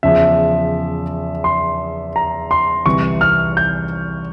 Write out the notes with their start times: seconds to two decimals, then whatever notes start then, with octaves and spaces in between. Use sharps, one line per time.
0.03 E2 C#3 F3 E5
1.44 C6
2.16 A#5
2.51 C6
2.85 C2 C3 E3 C#6
3.21 F6
3.57 G6